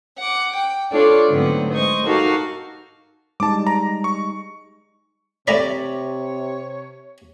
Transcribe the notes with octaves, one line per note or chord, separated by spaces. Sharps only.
F#5 D6
G5
D4 F4 A4 C#5 D5
G#2 D3 F#3 A3 B3 C4
G#3 C5 D#5 C#6
D#4 F#4 G4 A4 A#4 F5
G3 G#3 D#4 A5 D6
A#5
C#6
A2 C3 C#5 D5 A#5 B5